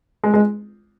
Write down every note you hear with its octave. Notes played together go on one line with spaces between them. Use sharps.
G#3
G#3